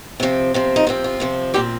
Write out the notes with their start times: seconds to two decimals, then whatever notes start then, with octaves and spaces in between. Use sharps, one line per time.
0.20 C3 F3 C4
0.54 C3 F3 C4
0.76 D#4
0.87 C3 F3 C4 F4
1.04 F4
1.20 C3 F3 C4
1.54 A#2 F3 G3 C4 G4